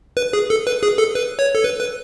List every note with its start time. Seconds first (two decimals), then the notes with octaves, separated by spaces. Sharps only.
0.17 B4
0.33 G#4
0.50 A4
0.67 B4
0.83 G#4
0.98 A4
1.15 B4
1.39 C#5
1.55 A4
1.64 B4
1.81 B4